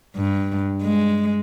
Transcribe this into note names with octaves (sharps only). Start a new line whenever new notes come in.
G2
G#3